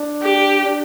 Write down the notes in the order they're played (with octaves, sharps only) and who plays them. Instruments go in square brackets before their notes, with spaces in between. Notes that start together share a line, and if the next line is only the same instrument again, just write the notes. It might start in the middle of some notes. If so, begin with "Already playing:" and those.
Already playing: [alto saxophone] D4
[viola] G4
[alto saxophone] D4